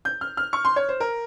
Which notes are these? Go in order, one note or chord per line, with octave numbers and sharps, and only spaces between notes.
G6
F6
F6
C#6
C6
C#5
C5
A#4